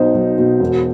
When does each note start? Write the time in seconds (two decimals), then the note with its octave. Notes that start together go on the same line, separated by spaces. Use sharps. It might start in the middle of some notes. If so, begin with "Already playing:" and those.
Already playing: B1 B2 D#4 C5
0.15 B1
0.38 B2
0.60 E1